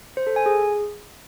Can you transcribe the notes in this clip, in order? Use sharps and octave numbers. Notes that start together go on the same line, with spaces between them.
C5
A4
G#5
G#4